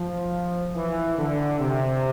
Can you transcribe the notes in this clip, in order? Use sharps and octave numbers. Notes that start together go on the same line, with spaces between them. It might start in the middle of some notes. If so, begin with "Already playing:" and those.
Already playing: F3
E3
D3
C3